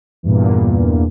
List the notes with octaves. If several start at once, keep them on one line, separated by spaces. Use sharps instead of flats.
E2 G2 A#2